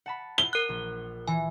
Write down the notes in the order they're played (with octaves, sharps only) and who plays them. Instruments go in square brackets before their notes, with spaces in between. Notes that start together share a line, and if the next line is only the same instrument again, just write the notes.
[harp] F#5 A5 B5
[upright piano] G7
[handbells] A#4 F#6
[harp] A#1
[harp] E3 [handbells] G#5